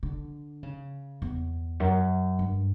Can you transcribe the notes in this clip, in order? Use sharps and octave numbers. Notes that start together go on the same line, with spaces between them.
D3
C#3
E2
F#2
G2